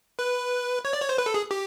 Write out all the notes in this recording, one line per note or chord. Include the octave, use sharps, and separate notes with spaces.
B4
C#5
D5
C#5
C5
B4
A4
G#4
G4